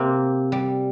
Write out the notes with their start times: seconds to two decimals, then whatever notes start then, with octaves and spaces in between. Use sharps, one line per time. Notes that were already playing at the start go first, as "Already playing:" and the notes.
Already playing: C3 A#3 C4
0.52 G3